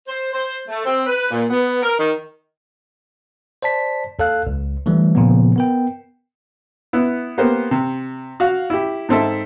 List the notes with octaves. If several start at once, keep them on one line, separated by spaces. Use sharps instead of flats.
C5
C5
A3
C4
B4
A#2
B3
A#4
D#3
C5 D5 A5 B6
D#2 A4 F5 F#6
C#2
D3 E3 G3 A3
A#2 C#3 F3 B3
B3 A#4 G5
B3 E4
A#3 B3 G4 C5
C3
F#4 F5
E4 G4
G#2 C4 A4 E5